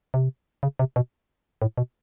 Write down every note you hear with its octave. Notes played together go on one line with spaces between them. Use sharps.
C3
C#3
C3
B2
A2
B2